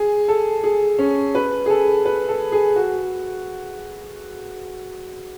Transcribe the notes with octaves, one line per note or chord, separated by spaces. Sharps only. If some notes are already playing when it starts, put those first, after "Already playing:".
Already playing: G#4
A4
G#4
C#4
B4
G#4
A4
B4
A4
G#4
F#4